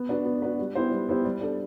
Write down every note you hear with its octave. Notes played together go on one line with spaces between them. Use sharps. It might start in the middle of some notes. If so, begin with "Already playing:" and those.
Already playing: B3
D4 F#4 B4
B3
D4 F#4 B4
G3
B3 E4 G4 C5
G3
B3 E4 G4 C5
G3
D4 A4